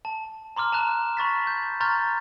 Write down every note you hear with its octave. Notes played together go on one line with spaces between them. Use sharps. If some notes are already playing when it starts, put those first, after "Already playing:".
A5
A#5 C6 D6 F6
A5 A#5 F#6 E7
B5 C#6 A6 B6
G6
A#5 C6 C#6 F6 G6 A6